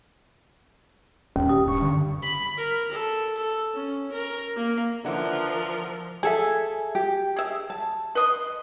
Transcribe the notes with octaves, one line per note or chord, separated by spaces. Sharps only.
D#1 C#4
G4 D#6
G2 C#6
D3
B5
A#4
A4
A4
C#4
A#4
A#3
D3 E3 F3 A#4 F#5
G#4 A4 E5 G#5
G4
G#4 E5
A5
B4 D#5 C6